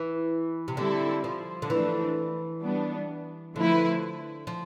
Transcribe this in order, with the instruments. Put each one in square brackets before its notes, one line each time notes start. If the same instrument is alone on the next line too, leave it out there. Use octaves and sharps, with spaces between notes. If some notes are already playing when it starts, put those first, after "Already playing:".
Already playing: [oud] E3
C3
[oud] D3 [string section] G3 C4 E4 A4
[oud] F3
D3
[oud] E3 [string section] F3 A3 D4
[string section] G3 B3 D4
[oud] D3 [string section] F3 A3 E4 B4
[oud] F3